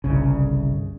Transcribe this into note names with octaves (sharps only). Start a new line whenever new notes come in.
G1 C2 C#3